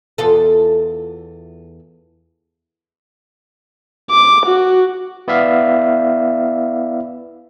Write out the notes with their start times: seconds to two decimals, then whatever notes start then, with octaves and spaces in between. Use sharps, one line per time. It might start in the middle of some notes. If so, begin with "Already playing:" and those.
0.18 E2 F4 A4
4.11 D6
4.46 F#4
5.28 B3 E4 D5 E5 F5